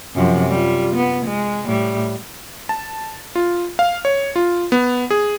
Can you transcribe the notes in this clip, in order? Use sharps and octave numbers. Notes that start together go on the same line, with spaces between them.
F#2 C3 F3
G3 F4
B3
G#3
A2 G3
A5
F4
F5
C#5
F4
B3
G#4